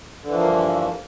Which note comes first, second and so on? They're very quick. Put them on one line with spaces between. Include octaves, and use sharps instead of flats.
D3 E3 F3 A#3 G2